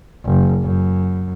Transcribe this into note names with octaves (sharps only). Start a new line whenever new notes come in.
F#1
F#2